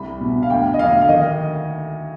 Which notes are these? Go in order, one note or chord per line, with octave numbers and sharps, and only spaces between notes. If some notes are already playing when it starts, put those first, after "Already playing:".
Already playing: C2 B5
B2
F5
D2 G5
D#5
D2 F5
F5
D#3 D#5